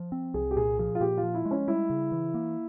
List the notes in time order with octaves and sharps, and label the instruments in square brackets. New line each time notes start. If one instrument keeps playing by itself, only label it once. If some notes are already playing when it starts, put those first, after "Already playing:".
Already playing: [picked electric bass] F3
C4
[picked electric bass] C2 [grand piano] G#4
[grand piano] G4
[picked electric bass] A#2 [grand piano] G#4
[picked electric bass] F3 [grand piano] G#4
[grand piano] F4
[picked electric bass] A#2 [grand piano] G4
[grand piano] F4
[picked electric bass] F3
[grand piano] E4
[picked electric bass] G#3
[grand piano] C#4
[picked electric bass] G3 [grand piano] E4
[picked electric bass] C#3
E3
A#3